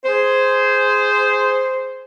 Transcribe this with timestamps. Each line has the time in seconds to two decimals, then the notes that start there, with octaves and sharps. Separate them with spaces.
0.04 G#4 C5